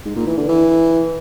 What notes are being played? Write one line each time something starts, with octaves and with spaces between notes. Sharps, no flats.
G#2
A#2
E3
D3
E3